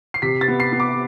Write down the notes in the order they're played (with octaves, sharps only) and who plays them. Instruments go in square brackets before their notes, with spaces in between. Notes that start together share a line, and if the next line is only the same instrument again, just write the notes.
[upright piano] C7
C3 B6
A6
B3
C7
B3
D6